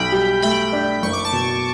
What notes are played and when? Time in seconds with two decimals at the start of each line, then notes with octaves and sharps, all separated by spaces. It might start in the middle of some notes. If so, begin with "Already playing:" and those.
Already playing: B1 G5 B5
0.12 G3
0.42 A3 G5 B5
0.73 D4
1.02 F#1 C#6
1.13 D6
1.25 A5 C#6
1.32 B2